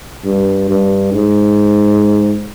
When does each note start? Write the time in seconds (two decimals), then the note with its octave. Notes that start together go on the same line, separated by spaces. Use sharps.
0.25 G2
0.69 G2
1.13 G#2